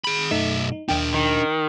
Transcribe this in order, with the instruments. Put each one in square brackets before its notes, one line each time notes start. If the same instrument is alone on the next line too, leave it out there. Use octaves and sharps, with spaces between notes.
[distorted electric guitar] G#4 B5
[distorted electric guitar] B1 E5 [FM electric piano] F#2 A3 D#4
[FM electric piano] D#4
[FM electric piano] D#2 G5 [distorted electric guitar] D4 A#4
[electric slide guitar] D#3